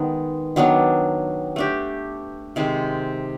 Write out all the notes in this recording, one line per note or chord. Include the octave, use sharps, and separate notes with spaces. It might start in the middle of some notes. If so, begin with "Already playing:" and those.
Already playing: D#3 G#3 B3
D#3 F#3 B3 D4
A3 D4 G4
C3 D#3 G#3 C4